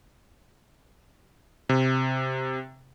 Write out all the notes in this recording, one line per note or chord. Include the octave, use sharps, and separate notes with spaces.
C3